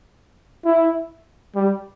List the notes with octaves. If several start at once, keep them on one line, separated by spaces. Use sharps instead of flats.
E4
G3